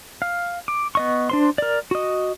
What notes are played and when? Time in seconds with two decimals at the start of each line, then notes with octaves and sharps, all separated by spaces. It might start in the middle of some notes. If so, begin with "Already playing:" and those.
0.22 F5
0.68 D6
0.95 B3 D#5 C#6
1.29 D4 C5 C6
1.58 A#4 D5
1.91 F#4 D#5